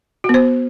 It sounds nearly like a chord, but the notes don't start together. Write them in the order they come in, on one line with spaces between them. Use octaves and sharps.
F#4 B3 C5